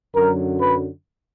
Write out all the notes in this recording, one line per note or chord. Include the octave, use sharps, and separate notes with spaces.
F#2 D3 F#3 A#4
B4